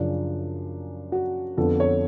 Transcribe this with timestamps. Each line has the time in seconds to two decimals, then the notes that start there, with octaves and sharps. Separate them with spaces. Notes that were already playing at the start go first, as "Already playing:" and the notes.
Already playing: F#2 C#3 F3 D4
1.12 F#4
1.58 F2 D3 F3 B3 A4
1.80 C#5